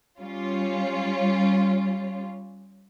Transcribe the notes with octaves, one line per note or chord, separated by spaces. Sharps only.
G3 C#4 F4